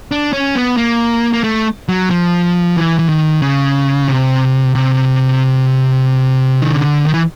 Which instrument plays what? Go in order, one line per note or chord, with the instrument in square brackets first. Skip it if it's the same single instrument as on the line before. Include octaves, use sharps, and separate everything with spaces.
[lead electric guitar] D4
C#4
B3
A#3
A#3
A3
F#3
F3
E3
E3
D#3
C#3
C3
C3
D#3
D3
D#3
E3